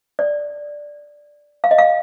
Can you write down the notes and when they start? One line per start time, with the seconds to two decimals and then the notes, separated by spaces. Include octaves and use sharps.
0.19 D5
1.64 F5
1.71 D#5
1.78 F5